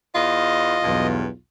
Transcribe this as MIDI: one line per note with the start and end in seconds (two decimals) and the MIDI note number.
0.15 0.77 40
0.15 1.37 65
0.15 1.07 75
0.83 1.27 35
0.83 1.27 40
0.83 1.27 43